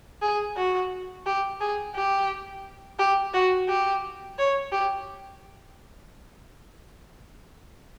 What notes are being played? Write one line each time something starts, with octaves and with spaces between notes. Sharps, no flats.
G#4
F#4
G4
G#4
G4
G4
F#4
G4
C#5
G4